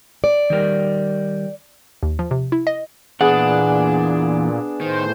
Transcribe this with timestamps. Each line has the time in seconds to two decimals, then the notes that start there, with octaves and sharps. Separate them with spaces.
0.24 D5
0.50 D#3 G3 A#4
2.03 D#2
2.19 F3
2.31 C3
2.52 E4
2.67 D#5
3.21 E2 A#2 B3 D4 G#4 F#5
4.81 A2 D#3 C5